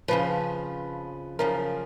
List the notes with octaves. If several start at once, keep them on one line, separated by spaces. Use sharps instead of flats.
F2 C#3 F3 B4
F#2 C#3 F3 A#4